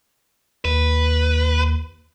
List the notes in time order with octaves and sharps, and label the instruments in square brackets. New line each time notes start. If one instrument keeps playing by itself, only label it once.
[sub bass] D#2 [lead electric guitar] B4